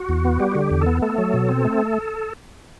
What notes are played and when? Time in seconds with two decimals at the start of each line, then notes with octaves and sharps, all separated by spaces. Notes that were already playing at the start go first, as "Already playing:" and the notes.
Already playing: F#4
0.09 E2
0.25 B3
0.40 G3 G4
0.52 D3 F#4
0.61 G4
0.71 E2
0.81 A4
0.86 B3
1.02 A3 A4
1.18 F#3
1.34 B2
1.49 C4
1.64 A3